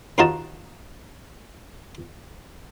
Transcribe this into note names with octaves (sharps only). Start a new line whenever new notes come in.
D#2 D#4 F4 F#4 D#5 A5